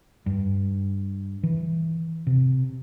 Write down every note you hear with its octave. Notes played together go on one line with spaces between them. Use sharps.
G2
E3
C3